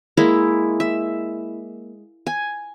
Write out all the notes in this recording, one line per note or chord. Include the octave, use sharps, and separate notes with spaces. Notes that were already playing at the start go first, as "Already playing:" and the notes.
G#3 A#3 E4
E5
G#5